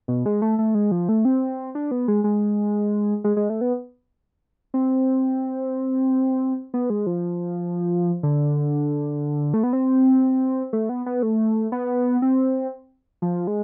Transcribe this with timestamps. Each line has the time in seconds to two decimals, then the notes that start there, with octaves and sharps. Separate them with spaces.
0.08 B2
0.26 G#3
0.42 A3
0.59 A3
0.75 G#3
0.91 F3
1.09 A3
1.25 C4
1.75 D4
1.91 B3
2.08 G#3
2.24 G#3
3.24 G#3
3.37 G#3
3.50 A3
3.61 B3
4.74 C4
6.74 B3
6.90 G#3
7.07 F3
8.23 D3
9.54 A3
9.63 B3
9.73 C4
10.73 A3
10.89 B3
11.06 B3
11.23 A3
11.72 B3
12.22 C4
13.22 F3
13.47 G#3